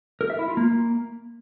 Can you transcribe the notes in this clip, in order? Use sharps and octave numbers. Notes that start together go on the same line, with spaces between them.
A#4
E5
E4
F4
A#3